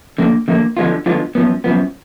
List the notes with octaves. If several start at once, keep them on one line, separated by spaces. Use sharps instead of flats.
D3 F3 A#3
D3 F3 A#3
D3 F3 G#3 B3 F4
D3 F3 G#3 B3 F4
F#2 F3 B3
F#2 F3 B3